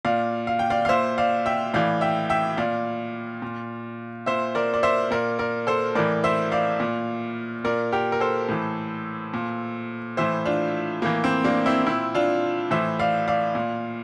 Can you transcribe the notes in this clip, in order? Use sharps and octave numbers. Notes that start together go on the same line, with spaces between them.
A#2 D5 F5
F5
G5
D5 F5
F5
A#2 C5 E5
D5 F5
E5 G5
A2 E3 D5 F5
E5 G5
E5 G5
A#2 D5 F5
A#2
A#2 C5 E5
A#4 D5
D5
C5 E5
A#2 A#4 D5
A#4 D5
A4 C5
A2 E3 A#4 D5
C5 E5
D5 F5
A#2
A#2 A#4 D5
G4 A#4
A#4
A4 C5
A2 E3
A#2
A2 E3 C5 E5
D4 F4
A2 E3 A#3
C4
A#3 D4
C4 E4
A#2 C4 E4
D4 F4
A2 E3 C5 E5
D5 F5
D5 F5
A#2